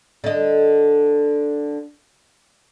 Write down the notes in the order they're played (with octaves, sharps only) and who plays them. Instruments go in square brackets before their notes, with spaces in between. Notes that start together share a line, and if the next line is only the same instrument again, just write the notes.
[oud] D3 D#5